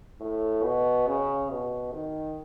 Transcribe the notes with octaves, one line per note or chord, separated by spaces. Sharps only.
A2
B2
C#3
B2
D#3